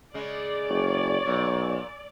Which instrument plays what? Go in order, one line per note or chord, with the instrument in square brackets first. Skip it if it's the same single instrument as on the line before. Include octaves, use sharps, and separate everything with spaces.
[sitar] C#3 G#3 [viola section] D5
[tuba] F#1 [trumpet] C#5
[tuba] B1 [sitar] A#2